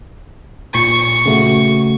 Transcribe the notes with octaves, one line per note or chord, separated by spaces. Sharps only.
A#2 C#6
C#3 A3 F#4